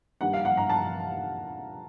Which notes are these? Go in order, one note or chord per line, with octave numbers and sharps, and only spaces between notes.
G2 D#3 G3 A#3 F#5
F5
F#5
A#5
A5